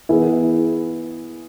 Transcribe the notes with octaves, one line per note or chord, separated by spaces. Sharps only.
E3 B3 E4 G#4